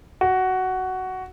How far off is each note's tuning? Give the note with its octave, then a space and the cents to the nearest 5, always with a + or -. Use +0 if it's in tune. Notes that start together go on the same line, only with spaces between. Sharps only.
F#4 +10